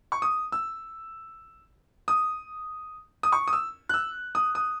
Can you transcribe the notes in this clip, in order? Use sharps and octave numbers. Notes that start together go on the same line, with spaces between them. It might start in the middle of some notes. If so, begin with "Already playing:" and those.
C#6
D#6
E6
D#6
D#6
C#6
D#6
E6
F#6
E6
D#6
D#6